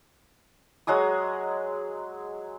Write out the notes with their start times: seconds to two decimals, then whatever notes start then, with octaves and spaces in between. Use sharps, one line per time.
0.87 F#3 G#3 G#4 D#6